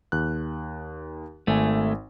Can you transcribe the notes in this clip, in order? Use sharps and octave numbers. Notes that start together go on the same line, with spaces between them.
D#2 F#6
G#1 A3 G#5